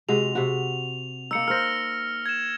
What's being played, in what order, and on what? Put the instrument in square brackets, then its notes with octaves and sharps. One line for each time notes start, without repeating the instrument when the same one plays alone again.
[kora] C3 G#3 F#4 [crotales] F7
[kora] C3 F#4
[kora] A#3 D#4 [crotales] E6 C#7
[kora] A#4 C5 [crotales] F6 A#6
[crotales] G#6 E7